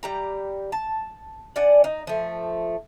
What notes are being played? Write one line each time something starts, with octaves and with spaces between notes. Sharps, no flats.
G3 G4 A#5
A5
D4 D5 F#5 G#5
D#4
F3 A3